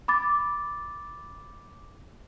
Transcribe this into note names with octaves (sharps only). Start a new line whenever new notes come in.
B5 D6 A6